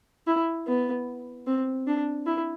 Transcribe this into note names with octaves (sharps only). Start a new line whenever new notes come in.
E4
B3
C4
D4
E4